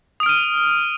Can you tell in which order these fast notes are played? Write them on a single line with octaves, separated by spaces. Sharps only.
D#6 D7 F6 D#7